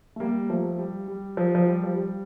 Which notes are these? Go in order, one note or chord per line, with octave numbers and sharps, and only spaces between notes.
A3
G3 A#3
F3 A3
G3
G3
F3
F3
G3
F3
G3